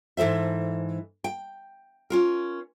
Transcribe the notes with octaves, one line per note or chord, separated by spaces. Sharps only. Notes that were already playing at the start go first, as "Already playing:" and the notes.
G#2 E3 A4 C5 E5
G5
C#4 F4 A#4